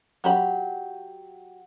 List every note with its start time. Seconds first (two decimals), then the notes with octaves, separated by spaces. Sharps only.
0.24 F#3 G4 B5